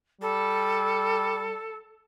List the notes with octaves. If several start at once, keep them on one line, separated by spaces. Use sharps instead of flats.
G3 A4